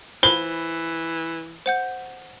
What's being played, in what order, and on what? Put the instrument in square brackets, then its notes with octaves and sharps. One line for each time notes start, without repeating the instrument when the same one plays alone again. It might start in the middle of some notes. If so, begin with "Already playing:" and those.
[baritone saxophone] E3 [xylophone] C5 B5 [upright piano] G7
[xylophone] C5 F#5 G6